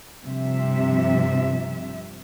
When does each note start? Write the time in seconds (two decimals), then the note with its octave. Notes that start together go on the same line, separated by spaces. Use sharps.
0.24 G2 C3 F3 E5